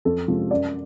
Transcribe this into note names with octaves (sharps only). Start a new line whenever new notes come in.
F2 A4
C3 F3 G#3
F#2 D5